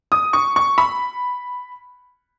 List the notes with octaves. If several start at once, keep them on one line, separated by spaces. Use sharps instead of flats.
D#6
C#6
C#6
B5